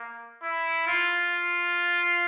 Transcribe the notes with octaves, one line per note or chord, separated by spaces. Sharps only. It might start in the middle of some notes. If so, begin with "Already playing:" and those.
Already playing: A#3
E4
F4